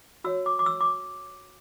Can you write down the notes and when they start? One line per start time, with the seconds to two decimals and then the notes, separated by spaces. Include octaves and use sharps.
0.24 F#4 C#5 E6
0.46 D6
0.59 D6
0.66 E6
0.81 D6